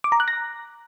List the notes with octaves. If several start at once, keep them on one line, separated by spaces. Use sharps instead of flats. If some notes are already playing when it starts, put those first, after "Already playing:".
D6
A#5
F#6
A#6